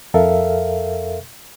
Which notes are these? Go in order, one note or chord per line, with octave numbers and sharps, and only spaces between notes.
F2 A4 A#4 E5 F5